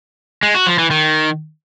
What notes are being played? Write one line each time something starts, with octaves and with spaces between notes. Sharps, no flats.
G#3
F#4
F3
E3
D#3